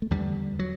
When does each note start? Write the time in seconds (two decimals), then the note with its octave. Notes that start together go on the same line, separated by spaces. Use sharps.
0.02 A3
0.11 E2 D3 G3
0.59 F#3